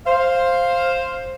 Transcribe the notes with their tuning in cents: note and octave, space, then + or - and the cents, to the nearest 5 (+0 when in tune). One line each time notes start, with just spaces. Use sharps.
C5 +10 F5 +0